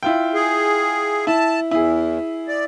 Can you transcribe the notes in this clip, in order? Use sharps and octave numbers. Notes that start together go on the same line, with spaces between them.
E4 F4 G5
G#4
E4 A5
E2 E4 G#4
D5